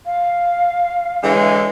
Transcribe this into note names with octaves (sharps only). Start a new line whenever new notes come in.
F5
D3 E3 G#3 C#5